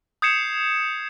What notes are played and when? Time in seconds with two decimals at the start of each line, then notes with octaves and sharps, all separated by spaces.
0.22 D#6 G6 G#6 C7 C#7 E7